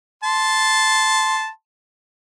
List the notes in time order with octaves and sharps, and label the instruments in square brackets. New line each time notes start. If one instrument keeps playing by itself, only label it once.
[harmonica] A5 C6